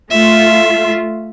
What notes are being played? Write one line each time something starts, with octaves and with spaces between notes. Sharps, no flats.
A3 F4 E5